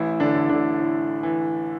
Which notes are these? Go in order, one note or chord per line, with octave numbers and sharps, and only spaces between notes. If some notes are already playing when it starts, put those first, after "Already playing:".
Already playing: A1 E3 E4
D3 D4
A1
D3 D4
A2
E3